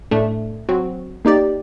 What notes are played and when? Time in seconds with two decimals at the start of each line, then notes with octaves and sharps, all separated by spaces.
0.11 A2 A3 D4
0.69 F#3 C4 F#4
1.25 A#3 D#4 G4 D5